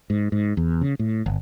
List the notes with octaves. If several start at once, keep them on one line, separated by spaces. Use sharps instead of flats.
G#2
G#2
E2
C#3
A2
G1